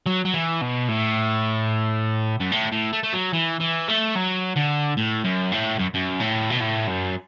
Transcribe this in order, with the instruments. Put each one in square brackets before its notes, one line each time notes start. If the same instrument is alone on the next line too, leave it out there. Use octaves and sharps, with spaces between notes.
[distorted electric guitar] F#3
F#3
E3
B2
A2
F#2
A2
A2
A3
A3
F#3
E3
E3
A3
F#3
D3
A2
F#2
A2
F#2
F#2
A2
B2
A2
F#2